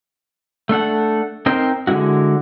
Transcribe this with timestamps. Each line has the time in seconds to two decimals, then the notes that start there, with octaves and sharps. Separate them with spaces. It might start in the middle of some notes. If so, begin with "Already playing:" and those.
0.69 A3 D4 A4 F#5
1.46 C4 D#4 A#4 C5 G5
1.87 D3 G#3 B3 E4 F#4